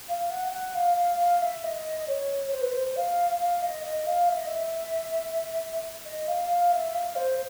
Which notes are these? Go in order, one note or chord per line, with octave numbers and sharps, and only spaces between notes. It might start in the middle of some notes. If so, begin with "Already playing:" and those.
F5
F#5
F#5
F5
F5
F5
E5
D#5
C#5
C5
B4
C5
F5
F5
D#5
D#5
F5
E5
D#5
E5
D#5
F5
F5
E5
F5
C5